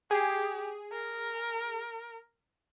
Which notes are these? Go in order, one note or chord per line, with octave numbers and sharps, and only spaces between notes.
G4 G#4
A#4